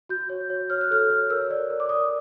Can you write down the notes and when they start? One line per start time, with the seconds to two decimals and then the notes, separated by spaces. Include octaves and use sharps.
0.09 F#4 G6
0.29 C#5
0.50 C#5
0.70 C#5 F6
0.81 F#6
0.91 A4 F6
1.10 C#5
1.30 A#4 E6
1.50 D5
1.70 A#4
1.80 D6
1.89 D5 D#6